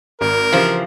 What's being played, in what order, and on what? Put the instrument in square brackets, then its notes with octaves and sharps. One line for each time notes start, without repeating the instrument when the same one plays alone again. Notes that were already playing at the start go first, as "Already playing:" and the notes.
[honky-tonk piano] G#1 [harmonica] A#4
[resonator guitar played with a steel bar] C#3 E3 F3 [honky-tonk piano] G4 C5 F5